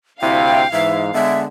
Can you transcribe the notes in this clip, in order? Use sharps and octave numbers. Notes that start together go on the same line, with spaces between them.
D2 C3 E4 F5 G5
G#2 E3 E5
D3 G#3 B3 E5